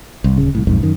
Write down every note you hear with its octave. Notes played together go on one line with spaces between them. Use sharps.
C2
D1 C#3
C2 A2
B1 F2 G#2
F#2 D#3